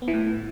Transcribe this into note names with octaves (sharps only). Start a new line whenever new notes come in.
B3
E3
A2